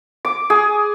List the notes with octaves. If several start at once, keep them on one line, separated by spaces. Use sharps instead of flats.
D6
G#4